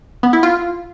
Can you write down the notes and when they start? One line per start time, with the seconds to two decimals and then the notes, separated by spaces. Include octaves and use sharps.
0.23 B3
0.33 E4
0.43 F4